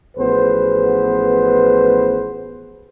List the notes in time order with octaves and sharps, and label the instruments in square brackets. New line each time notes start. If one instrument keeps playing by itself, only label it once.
[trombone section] A1 F3 B3 G#4 B4 C5